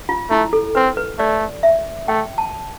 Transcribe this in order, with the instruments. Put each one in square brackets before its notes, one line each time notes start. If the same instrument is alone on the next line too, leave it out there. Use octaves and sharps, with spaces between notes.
[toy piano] F4
[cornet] A3 [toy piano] E4
[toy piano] A4
[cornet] C4 [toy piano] B4
[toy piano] B4
[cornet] A3 [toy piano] D5
[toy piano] E5
[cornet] A3 [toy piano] G5
[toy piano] A5